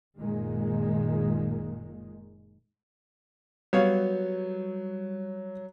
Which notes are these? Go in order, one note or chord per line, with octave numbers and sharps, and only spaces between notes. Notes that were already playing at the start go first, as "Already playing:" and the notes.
F#1 A#2 D#3 G#3
F#3 G3 B3 C#5 F5